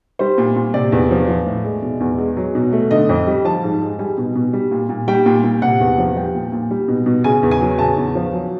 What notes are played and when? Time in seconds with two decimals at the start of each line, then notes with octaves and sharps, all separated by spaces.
0.19 G3 C5
0.38 A#2
0.56 A#2
0.74 C3 D5
0.92 E2
1.11 F3
1.28 F3
1.46 A2
1.64 G#3
1.82 B2
2.00 E2
2.18 G#3
2.37 F#3
2.55 B2
2.73 A3
2.91 D3 D#5
3.09 F2
3.27 G3
3.45 F3 A5
3.63 G#2
3.82 G#3
3.99 G3 G#5
4.18 B2
4.35 B2
4.53 G3
4.71 A#2
4.89 A#2
5.08 G3 G5
5.26 A#2
5.44 A#2
5.62 C3 F#5
5.80 E2
5.98 F3
6.16 G3 G5
6.35 A#2
6.52 A#2
6.71 G3
6.88 B2
7.06 B2
7.24 C#3 G#5
7.43 E2
7.51 G#5
7.61 F#3
7.79 C#3 A5
7.97 E2
8.15 F3
8.33 F#3